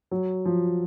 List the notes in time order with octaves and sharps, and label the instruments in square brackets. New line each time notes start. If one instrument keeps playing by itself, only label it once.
[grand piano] F#3
F3